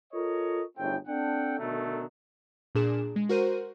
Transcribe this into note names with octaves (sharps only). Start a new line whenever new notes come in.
F4 A4 A#4 C#5 D#5
G1 A2 C#3 C4 G5
C4 D4 A4 F#5 G5
B2 D3 D#3 F#3 A3
A#2 D4 G#4 E7
G#3
F#4 A#4 C5 D#7